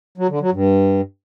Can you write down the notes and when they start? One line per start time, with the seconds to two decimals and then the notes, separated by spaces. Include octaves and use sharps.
0.18 F#3
0.29 D3
0.40 F#3
0.52 G2